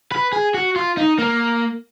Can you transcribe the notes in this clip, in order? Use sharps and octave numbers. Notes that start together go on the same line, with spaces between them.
B4
G#4
F#4
F4
D#4
A#3